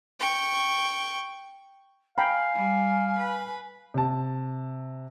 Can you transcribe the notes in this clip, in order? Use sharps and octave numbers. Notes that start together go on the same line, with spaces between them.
G5 C#6
F5 G5 G#5 A#5 B5
G3
B4
C3 A5